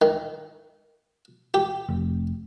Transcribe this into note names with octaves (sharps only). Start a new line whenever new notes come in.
D#3
G4
F1